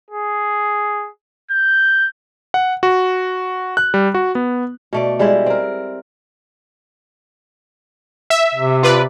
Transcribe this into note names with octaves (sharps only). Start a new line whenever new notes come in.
G#4
G6
F#5
F#4
F#6
G3
F#4
B3
B2 A3 D5
G3 G#3 E4 E5
C4 A#4
E5
C3
F4 B4 D5